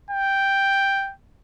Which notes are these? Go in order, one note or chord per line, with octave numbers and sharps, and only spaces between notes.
G5